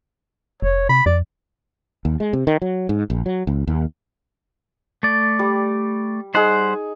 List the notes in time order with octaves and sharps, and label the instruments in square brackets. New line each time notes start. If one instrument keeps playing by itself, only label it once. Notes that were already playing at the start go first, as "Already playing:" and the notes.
[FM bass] F1 [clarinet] C#5
[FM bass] C3 [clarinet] B5
[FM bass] F2 [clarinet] D5
[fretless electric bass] D#2
G#3
C3
D#3
F#3
G#2
A#1
F#3
C#2
D#2
[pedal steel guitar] A3 D5
[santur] G3
[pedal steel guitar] G3 C5 F#5 [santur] D#4 G#4